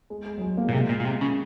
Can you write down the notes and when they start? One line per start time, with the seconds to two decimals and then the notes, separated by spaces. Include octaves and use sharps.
0.10 G#3
0.26 G#3
0.37 F#3
0.41 G#3
0.57 A#3
0.68 A#2
0.73 C3 G#3
0.89 A#2
1.00 A#2
1.05 C3
1.21 C#3